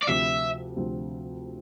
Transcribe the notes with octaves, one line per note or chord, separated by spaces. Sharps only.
D5
D2 C3 F3 C4 E5
D2 C3 F3 C4